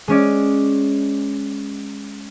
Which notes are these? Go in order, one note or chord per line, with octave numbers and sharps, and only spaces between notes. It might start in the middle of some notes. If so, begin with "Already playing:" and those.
G#3 C#4 D5